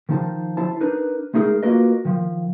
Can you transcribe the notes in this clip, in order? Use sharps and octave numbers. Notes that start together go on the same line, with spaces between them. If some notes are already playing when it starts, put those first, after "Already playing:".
D#3 F3 D#4 C5 A5
E4 C5 A5
D4 D#4 A#4 B4
G#3 A3 D#4 G#4 A#4
A#3 F4 F#4 A#4 B4 D#5
D#3 F3